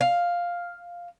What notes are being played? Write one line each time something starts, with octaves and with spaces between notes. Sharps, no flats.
F5